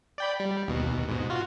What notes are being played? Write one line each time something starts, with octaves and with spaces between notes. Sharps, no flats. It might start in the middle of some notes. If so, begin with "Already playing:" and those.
D5 G5 B5
G3
D#2 B2
G#2 B2
F4 F#4